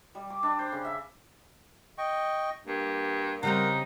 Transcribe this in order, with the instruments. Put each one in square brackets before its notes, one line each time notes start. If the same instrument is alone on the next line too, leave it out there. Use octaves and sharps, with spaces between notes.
[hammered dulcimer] G3
D6
D4
C5
C#3
E5
[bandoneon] D#5 G5 C#6
[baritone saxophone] G2 [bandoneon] A#3
[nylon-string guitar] C#3 G3 C4 [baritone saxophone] D#4 [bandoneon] A#4 F#5